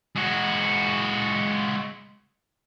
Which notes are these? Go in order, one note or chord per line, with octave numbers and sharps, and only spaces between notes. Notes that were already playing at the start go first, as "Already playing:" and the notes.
G#3 F#4